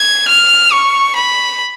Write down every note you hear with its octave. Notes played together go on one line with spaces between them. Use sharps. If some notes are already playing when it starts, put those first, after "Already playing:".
Already playing: G#6
F6
C#6
B5